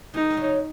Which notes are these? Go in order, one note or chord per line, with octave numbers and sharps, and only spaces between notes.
D#3 G#3 D#4
D#3
C#3 F#3